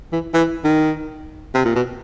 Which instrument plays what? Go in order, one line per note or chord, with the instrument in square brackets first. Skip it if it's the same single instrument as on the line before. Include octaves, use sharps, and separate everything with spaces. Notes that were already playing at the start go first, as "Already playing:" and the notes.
[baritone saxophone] E3
E3
D#3
C3
A#2
B2